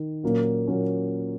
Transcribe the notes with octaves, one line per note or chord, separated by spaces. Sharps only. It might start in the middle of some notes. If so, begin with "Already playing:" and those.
Already playing: D#3
A#2 F#3 A#3 C#4
A#2 F#3 A#3 C#4